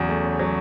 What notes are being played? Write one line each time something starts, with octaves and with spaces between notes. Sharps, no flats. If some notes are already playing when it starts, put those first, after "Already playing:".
Already playing: E2 C#3 F#3
A3
C#3
F#3